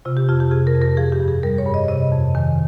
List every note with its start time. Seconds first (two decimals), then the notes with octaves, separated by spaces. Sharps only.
0.05 C3 F4
0.17 G4
0.29 F2 F4
0.40 G4
0.51 C3 G#4
0.67 A#4
0.74 F2
0.82 A#4
0.97 F3 G#4
1.12 G4
1.20 G2
1.28 G#4
1.43 G3 A#4
1.58 C#5
1.66 G2
1.74 D#5
1.88 C3 D#5
2.12 F2
2.35 D#3 G#5